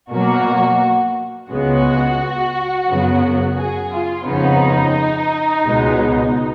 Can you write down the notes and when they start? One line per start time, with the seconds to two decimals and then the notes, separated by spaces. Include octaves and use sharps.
0.10 B2 F#3 A#3 F#4
1.49 C#2 C#3 G#3 B3 F#4
2.87 F#2 C#3 F#3 B3
3.57 G#4
3.92 F4
4.26 F2 C#3 F3 B3 D#4
5.64 C#2 B2 G#3 B3